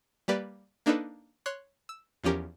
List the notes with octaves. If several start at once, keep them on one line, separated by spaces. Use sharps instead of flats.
G3 A#3 G4 B4 D5
A#3 D4 D#4 A4 B4
C#5 C6 F#6
E6
E2 F3 C#4 G4 A#4